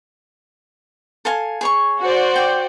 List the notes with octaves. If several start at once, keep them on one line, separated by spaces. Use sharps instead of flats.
A4 F5 G#5
G#4 C#5 C#6
F#4 C5 D5
G5